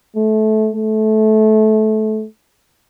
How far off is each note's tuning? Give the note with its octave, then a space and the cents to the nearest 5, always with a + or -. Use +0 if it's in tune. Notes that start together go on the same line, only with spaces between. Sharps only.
A3 -20
A3 -20